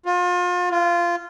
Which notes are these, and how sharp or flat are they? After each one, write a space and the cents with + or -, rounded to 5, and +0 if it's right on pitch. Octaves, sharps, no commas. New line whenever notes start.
F4 +35
F4 -15